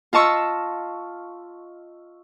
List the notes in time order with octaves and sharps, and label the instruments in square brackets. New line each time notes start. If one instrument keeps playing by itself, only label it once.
[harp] F4 D#5 A5 C#6 E6